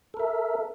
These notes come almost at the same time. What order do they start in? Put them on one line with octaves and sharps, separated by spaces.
A4 A#4 E5